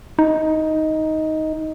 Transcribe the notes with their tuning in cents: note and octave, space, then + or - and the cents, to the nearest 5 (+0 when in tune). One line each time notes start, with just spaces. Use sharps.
D#4 +10